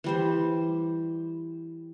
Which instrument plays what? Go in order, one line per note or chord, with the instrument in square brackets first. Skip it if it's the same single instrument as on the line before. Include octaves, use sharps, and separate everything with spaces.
[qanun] E3 G3 C5